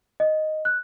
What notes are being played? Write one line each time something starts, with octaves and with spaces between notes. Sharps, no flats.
D#5
F#6